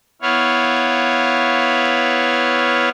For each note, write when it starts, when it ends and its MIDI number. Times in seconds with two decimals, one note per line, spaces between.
0.22 2.89 59
0.22 2.89 64
0.22 2.89 73
0.22 2.89 77